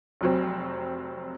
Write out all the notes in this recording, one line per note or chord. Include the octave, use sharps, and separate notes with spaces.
F1 F#3 C4